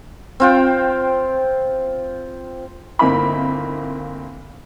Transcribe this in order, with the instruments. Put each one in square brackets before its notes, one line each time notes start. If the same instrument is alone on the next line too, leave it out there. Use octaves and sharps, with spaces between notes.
[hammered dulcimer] C4 F4 G5
[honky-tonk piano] G1 A#3 C4 D#4 E4 B5